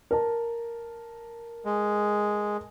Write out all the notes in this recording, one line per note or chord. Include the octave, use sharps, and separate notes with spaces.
A#4 A5
G#3